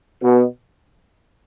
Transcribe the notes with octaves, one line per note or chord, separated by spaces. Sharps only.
B2